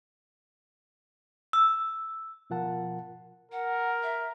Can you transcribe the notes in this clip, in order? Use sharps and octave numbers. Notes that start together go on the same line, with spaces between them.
E6
B2 F3 F4 A#4 F#5 A5
A#4 F#5
E5